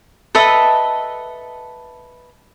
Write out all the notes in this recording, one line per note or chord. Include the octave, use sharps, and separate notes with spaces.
A4 B4 D#5 E5